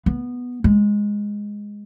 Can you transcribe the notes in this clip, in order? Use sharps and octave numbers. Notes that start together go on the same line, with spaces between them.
B3
G#3